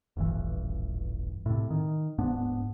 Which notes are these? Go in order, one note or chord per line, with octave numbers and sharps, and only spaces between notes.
D#1 A1 G2 E3
A2 C3
D#3
D1 G#2 B3 D4